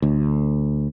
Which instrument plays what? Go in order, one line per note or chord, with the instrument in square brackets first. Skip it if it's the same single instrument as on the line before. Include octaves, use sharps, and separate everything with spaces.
[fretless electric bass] D2